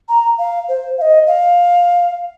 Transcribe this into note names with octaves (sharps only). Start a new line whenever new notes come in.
A#5
F5
C5
F5
D#5
F5